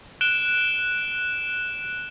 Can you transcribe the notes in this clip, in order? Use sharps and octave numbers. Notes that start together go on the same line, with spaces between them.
F#6 D7 E7 G7